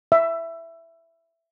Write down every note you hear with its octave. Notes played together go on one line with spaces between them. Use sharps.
E5